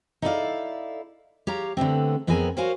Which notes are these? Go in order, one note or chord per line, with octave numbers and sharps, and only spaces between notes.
D#4 E4 A4 B4 D5 F5
G4 C#5 F5 A#5
D3 A3 B3 C4
F2 B3 C4 G#4 A#4 G#5
F#4 A#4 C5 C#5 F5 G#5